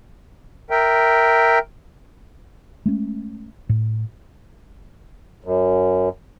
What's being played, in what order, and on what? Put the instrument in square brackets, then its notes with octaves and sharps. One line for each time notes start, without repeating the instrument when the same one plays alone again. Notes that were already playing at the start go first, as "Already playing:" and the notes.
[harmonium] A#4 E5 G5
[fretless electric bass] G#3 A3 C#4
A2
[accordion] F#2